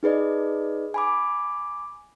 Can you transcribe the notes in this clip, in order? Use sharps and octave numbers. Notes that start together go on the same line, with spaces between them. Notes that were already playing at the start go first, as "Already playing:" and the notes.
D#4 G#4 B4 D5 D#5
G#5 B5 D6